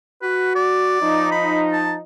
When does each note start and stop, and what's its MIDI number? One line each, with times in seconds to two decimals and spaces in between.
0.22 0.96 66
0.22 0.54 71
0.55 1.31 74
1.01 2.03 53
1.01 2.03 63
1.32 1.61 83
1.72 1.93 81